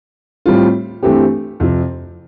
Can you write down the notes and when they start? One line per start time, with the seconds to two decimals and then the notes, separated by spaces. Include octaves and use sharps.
0.46 A2 G3 C4 F4
1.03 G2 E3 A3 C4 G4
1.60 F2 C3 F3